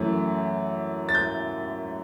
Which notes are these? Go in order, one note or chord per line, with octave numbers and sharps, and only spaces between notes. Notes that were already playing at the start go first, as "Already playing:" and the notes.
Already playing: F#2 E3 A3
A6
G6